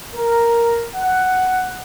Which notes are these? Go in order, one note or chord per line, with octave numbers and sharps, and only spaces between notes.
A#4
F#5